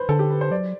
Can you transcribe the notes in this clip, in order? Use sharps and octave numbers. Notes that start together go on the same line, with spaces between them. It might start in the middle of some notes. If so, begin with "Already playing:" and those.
Already playing: B4 C5
D3 A4
G4
B4
C5
F#3 D5